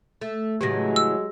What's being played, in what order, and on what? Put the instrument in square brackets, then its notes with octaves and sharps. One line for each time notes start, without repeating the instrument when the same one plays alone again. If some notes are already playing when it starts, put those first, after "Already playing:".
[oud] A3
[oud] A2 C#3 E3 [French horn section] F#3 G#3 [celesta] G4 A#6
[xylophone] E6